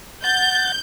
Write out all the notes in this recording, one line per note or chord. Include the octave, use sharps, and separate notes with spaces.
F#5 G6 A6